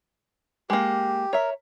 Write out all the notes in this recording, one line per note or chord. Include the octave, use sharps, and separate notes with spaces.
G#3 A#3 G4
A#4 C#5 E5